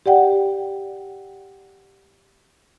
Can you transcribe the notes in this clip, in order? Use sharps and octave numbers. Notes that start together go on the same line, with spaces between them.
G4 D5 F#5 G5